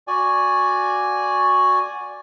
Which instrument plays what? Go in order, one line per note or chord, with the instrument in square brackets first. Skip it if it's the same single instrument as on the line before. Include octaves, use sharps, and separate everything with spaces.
[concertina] F#4 D5 G#5